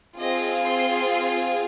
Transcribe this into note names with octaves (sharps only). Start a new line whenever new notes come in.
C4 F4 G#4 D#5
C6